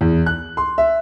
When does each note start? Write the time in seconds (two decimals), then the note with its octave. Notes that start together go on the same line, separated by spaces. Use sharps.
0.01 E2
0.26 F#6
0.57 C6
0.78 E5